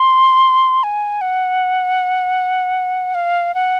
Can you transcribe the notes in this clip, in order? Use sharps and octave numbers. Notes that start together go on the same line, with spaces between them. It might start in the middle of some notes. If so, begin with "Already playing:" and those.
Already playing: C6
G#5
F#5
F5
F#5